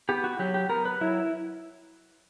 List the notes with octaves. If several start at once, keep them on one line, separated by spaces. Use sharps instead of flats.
B3 G4
F#4
F#3 G4
G4
B3 A#4
B4
F#3 E4